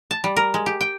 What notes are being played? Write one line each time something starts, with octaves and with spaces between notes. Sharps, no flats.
A5
G3
A#4
G#3
G4
G5